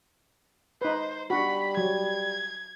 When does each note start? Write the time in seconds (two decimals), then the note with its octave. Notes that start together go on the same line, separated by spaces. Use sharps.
0.81 D#4 B4 C5
1.30 G3 D4 F#4 B5
1.77 F#3 G#6